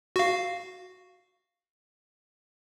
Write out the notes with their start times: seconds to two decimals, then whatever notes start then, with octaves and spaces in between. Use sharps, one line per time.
0.16 F#4 F5